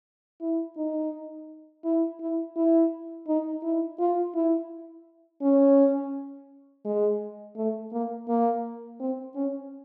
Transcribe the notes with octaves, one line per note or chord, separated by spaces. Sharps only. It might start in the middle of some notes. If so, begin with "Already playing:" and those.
E4
D#4
E4
E4
E4
D#4
E4
F4
E4
C#4
G#3
A3
A#3
A#3
C4
C#4